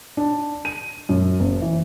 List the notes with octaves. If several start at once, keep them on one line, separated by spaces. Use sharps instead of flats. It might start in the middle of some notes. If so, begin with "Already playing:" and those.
D4
D#7
F#2
F#1
E3